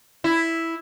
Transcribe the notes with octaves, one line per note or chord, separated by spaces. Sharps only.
E4